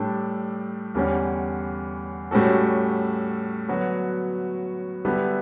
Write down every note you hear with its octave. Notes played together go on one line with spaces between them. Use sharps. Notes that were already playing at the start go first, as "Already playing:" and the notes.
Already playing: A2 G3 D4 A4
E2 D3 G3 C#4
A2 G3 C#4 F#4 A4
D3 F#3 B3 F#4
D3 G3 B3 E4